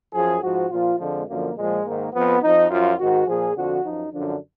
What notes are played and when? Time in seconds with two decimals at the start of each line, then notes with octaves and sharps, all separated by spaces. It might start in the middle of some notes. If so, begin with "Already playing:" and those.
0.13 F#2 F3 G#4
0.42 G#2 F3 F#4
0.71 A#2 F3 F4
0.99 F2 D3 F3 G#3
1.27 F#2 D3 F3 A#3
1.56 A#2 F3 G#3
1.84 G#2 D#3 A#3
2.13 F2 F3 B3
2.41 F2 F3 D#4
2.69 F#2 F3 F4
2.98 G#2 D#3 F#4
3.26 A#2 F3 G#4
3.55 F2 D3 F3 F#4
3.84 F#2 F3 D#4
4.12 F#2 D3 F3 D4